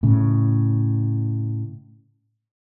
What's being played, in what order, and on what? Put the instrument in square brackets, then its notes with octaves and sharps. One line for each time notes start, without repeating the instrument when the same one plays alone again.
[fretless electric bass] A2 C#3